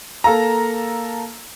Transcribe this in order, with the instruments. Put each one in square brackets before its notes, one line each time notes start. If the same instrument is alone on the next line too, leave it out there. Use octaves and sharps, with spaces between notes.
[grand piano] A#3 A4 F5 A#5